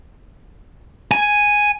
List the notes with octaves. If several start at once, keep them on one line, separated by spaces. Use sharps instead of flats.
G#5